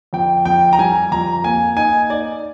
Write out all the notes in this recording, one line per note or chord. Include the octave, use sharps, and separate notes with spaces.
F2 G5
F2 G5
A#5
G3 G#5
F2 A#5
A#3 G#5
D#4 G#5
D#4 D5